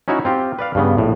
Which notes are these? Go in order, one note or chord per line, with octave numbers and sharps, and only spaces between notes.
C#4 D#4 E4 F#4 C#5
C4 F4 G4
B4 D5 F5
G2 C#3 B3
A#1 A2